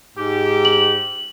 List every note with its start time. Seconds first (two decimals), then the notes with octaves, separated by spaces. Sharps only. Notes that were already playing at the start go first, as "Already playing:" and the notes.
0.17 G#2 G4
0.65 F#7